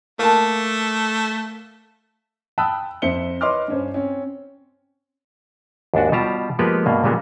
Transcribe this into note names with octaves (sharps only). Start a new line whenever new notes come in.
A3 A#3 A5
G5 A5 B5 D#6 E6 F#6
F2 C5 E5 C#7 G7
B4 C#5 D#5 C6 D6 F6
G2 C#4 C5
C4 C#4
D#2 G#2 D4 F#4
B2 G3 F4 G4 A5 A#5
F3 G#3 A#3 B3 G4 B4
G2 B2 A#3
A#2 C#3 G3 G#3 A#3 B3